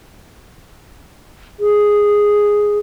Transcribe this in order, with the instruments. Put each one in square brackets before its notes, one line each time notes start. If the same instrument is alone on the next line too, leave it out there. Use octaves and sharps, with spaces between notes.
[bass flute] G#4